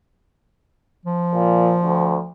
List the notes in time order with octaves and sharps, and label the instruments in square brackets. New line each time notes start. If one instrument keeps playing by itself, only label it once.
[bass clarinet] F3
[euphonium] A#2
D2